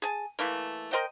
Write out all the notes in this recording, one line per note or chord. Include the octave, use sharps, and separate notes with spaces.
G#4 G#5 A5
E3 A3 A#3
A#4 C5 D#5 G5